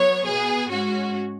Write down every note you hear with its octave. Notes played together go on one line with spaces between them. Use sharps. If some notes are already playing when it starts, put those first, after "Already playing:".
Already playing: F#3 B3 C#5
B2 B3 G#4
G#2 G#3 C#4 F#4